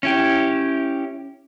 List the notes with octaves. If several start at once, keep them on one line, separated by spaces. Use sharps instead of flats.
C#4 E4 G4